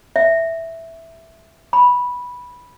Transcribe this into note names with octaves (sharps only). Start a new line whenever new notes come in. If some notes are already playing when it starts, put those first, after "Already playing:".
E5
B5